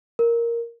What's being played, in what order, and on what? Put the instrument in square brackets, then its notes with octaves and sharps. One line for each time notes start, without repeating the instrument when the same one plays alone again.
[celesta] A#4